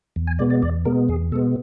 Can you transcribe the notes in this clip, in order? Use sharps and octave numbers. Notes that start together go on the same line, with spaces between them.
E2
G#5
B2 G#3 B3 D5
D5
E2 D5
B2 G#3 B3 A#4
E2 G#4
B2 G#3 B3 A4